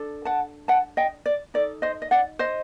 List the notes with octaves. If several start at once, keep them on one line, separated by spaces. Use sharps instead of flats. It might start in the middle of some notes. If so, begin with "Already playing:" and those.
Already playing: D4 A4
F#5 A5
F#5 A5
D#5 G5
D5
D#4 A4 D5
C5 D#5
D#5
D5 F#5
C5 D#5